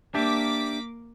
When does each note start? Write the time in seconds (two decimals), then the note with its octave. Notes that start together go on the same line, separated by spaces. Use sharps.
0.14 A#3 D4 G4 E5 D6 B6